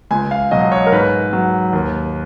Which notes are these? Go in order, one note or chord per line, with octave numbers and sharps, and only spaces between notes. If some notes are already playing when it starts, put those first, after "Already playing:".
C#2 G#5
F5
B2 F#3 D#5
C#5
A#4
G#2 B4
F#3
D#2